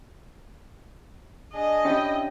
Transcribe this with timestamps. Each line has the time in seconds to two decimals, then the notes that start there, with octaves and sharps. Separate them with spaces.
1.54 D4 G#4 D#5
1.85 C#4 D4 E4 G4 G5